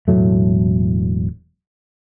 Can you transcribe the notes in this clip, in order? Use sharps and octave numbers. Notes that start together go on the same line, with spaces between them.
E1 A2 F#3 A3